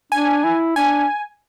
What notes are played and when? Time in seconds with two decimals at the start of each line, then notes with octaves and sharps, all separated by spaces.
0.12 D4 G#5
0.44 E4
0.76 D4 G#5